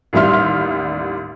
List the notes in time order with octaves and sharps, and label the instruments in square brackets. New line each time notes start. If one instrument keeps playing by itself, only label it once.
[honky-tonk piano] A1 D#2 G3 E5 C6 F6